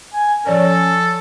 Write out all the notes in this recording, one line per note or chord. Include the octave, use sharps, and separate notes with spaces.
G#5
F3 C#4 A4 C#5 D5